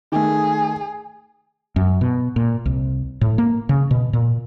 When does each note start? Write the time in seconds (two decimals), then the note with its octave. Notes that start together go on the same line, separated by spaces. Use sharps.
0.12 D#3 A3 G#4
1.76 F#2
2.01 B2
2.36 A#2
2.66 C2
3.21 A2
3.38 A#3
3.69 C#3
3.91 B2
4.13 A#2